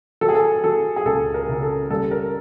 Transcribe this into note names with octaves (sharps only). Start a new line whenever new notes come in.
F#3 A4
G#4
A4
F#3 A4
G#4
C#2 A4
A#4
C#3
A4
G3 A4
A#4